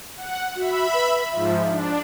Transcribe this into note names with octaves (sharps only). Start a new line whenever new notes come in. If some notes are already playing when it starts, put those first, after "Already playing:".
F#5
F#4 E5 B5
B4
G#2 F3 E5
D4